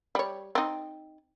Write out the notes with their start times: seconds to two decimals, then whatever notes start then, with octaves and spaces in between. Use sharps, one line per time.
0.15 G3 C#5
0.55 C4 D#4